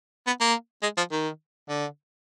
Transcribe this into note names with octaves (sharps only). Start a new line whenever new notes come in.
B3
A#3
G#3
F3
D#3
D3